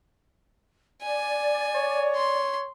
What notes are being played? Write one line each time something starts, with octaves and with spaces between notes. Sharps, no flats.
D5 G#5
C#5
C6